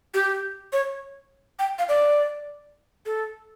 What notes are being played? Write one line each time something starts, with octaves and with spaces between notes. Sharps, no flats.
G4
C#5
G5
F5
D5
A4